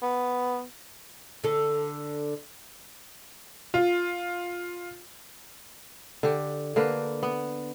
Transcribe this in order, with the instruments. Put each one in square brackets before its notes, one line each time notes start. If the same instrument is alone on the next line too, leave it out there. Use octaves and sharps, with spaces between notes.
[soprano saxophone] B3
[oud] D3 A4
[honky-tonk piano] F4
[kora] D3 G4
D3 A#3 A#4 B4
B3